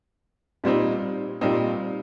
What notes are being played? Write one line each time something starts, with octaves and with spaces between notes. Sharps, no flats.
A#2 G3 C4 D#4
A#2 G3 C4 D#4